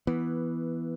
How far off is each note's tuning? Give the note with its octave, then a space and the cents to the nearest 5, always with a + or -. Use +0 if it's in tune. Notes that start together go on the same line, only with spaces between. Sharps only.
E3 +0 B3 -10